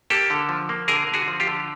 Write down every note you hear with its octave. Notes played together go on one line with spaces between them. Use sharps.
A#3 G4 A4
D3
F3
A#3
D3 G#4 A#4
D3
F#4 G#4
F3
F4 G4
D3